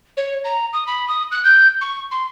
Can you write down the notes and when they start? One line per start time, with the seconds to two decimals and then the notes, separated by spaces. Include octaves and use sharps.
0.17 C#5
0.44 A#5
0.73 D#6
0.87 B5
1.08 D#6
1.32 F#6
1.45 G6
1.81 C#6
2.11 C6